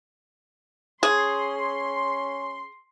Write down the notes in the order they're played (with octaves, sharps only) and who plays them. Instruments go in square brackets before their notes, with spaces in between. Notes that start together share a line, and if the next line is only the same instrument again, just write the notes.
[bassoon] C#4 [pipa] G#4 [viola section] C6